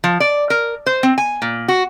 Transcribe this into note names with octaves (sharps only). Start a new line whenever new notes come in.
F3
D5
A#4
C5
C4
G#5
A#2
F#4